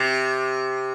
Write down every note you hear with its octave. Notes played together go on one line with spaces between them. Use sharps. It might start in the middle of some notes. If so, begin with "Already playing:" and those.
Already playing: C3